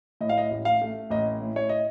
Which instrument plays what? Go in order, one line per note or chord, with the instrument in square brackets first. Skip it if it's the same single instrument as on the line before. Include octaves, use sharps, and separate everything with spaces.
[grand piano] A2 D#5
F5
D#5
A1
F5
A3
A1 D#5
A2
C#5
D#5